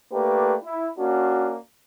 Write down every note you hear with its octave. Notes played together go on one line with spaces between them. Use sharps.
A3 A#3 D4 G4 B4
E4
A#3 C#4 D4 F#4